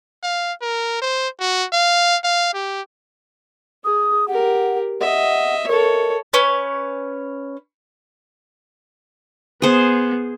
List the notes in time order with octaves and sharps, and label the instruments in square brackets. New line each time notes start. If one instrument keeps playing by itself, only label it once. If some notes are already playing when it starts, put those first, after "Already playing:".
[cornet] F5
A#4
C5
F#4
F5
F5
G4
[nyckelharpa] G#4 [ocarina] D#6
[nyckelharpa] G4 A#4 [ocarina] F#5
[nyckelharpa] D#5 E5 [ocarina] F#5
[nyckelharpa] A4 C#5 [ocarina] A#4
[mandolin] C#4 B4 C#5
[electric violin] B3 [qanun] G#4 C5